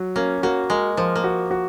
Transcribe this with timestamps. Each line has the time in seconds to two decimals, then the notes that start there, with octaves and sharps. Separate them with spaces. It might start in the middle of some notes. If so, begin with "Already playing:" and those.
Already playing: F#3
0.16 A#3 C#4
0.43 A#3 F#4
0.70 G#3 A#4
0.97 F3 A#4
1.15 A#3
1.24 F#4
1.51 F#4